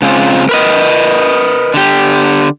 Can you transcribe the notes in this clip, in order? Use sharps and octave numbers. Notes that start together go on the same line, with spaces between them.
C#3 G#3 C4 F4
A#4 B4 D#5
D3 G4